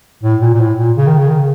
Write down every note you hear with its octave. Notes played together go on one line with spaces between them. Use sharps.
A2
A#2
A#2
A2
A#2
C#3
D#3
C#3
D#3
C#3